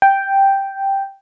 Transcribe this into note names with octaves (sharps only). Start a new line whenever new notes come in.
G5